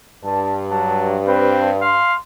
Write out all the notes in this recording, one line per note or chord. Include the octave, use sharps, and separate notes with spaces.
G2 A5
F#3 A5
C4 B4
F5 C6